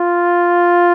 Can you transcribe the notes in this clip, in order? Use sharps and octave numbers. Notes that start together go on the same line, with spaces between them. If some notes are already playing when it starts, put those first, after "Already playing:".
Already playing: F4